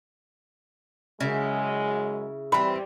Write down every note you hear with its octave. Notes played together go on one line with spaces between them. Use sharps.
F#2 C#3 G#3 E4
E3 G3 C4 B5